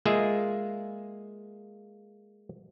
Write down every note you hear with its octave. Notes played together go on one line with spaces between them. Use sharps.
G#3 A#3 F4 G#4 E5